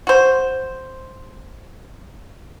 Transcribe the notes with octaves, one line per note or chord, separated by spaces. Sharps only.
F#4 C5